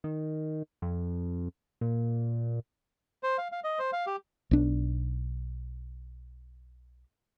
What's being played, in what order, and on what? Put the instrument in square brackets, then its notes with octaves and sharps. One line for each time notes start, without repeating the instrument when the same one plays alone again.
[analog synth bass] D#3
F2
A#2
[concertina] C5
F5
F5
D#5
C5
F5
G4
[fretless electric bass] B1 D4